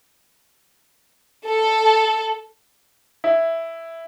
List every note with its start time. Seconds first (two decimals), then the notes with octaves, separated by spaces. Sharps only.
1.46 A4
3.24 E4